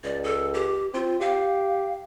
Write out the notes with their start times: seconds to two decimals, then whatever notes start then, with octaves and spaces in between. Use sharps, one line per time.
0.04 C#2 D5
0.24 A4
0.54 G4
0.94 C4 F4
1.21 G4 F5